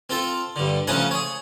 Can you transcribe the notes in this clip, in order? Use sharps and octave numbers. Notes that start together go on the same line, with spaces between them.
C4 F4 A4
G2 D3
C#3 F3 A3 F#5 G#5 A#5
G#4 C#5